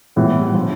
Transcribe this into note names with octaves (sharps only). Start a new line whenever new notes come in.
A2 E3 G3 B3
D3 F3